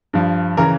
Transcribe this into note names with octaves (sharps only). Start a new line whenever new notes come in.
G2 F3
C#3 E3 A#4